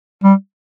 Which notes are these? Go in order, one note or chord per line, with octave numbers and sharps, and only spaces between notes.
G3